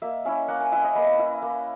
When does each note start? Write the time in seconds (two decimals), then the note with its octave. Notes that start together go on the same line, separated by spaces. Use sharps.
0.02 A#3 E5
0.25 C#4 E4 E5
0.48 A#3 F#5
0.60 G#5
0.72 C#4 E4 E5
0.84 D#5
0.95 A#3 B4
1.19 E4
1.42 A#3